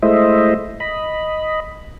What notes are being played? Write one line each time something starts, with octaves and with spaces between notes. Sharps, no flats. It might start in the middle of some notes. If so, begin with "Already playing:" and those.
G#3 A3 E4 C5 D#5 E5
D#5 B5